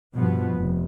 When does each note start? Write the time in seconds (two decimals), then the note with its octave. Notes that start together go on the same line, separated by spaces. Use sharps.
0.14 G2 B2 F3 B3
0.54 F1